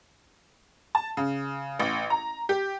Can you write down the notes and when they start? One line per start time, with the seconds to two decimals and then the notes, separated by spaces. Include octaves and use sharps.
0.95 A5
1.17 C#3
1.80 A1
2.10 A#5
2.49 G4